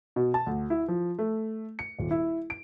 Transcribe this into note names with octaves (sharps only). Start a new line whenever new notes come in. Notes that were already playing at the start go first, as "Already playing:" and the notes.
B2
A5
D2
E4
F3
A3
C#7
D#1
E4
D7